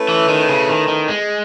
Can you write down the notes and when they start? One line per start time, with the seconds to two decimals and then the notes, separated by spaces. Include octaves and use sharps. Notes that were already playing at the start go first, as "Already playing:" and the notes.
Already playing: A3 C#4 E4 B4
0.09 E3
0.28 D#3
0.49 C#3
0.69 D#3
0.88 D#3
1.08 G#3